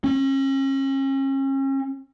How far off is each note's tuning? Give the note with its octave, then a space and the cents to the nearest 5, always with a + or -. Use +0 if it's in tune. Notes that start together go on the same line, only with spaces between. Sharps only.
C#4 -35